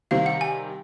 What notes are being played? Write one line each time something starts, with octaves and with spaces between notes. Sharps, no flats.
C3 D#3 G3 C4 F5
F#5
G#5